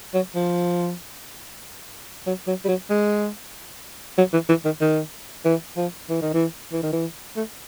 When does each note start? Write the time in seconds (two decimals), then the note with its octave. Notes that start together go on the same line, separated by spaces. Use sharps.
0.14 F#3
0.35 F3
2.27 F#3
2.47 F#3
2.65 G3
2.69 F#3
2.90 G#3
4.18 F#3
4.33 E3
4.49 E3
4.65 D#3
4.81 D#3
5.45 E3
5.77 F3
6.09 E3
6.22 D#3
6.34 E3
6.72 E3
6.83 D#3
6.93 E3
7.37 A3